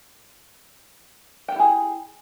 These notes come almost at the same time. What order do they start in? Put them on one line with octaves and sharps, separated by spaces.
G5 G4 E4 G#4